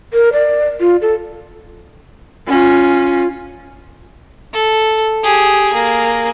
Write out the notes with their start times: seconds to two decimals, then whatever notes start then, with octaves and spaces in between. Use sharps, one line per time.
0.14 A#4
0.33 D5
0.80 F4
1.01 A4
2.47 C#4 F4
4.54 A4
5.24 G4 G#4
5.73 A#3 G#4